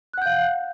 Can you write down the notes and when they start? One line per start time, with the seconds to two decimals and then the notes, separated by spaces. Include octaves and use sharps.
0.13 F#6
0.18 F#5
0.22 G6
0.26 F5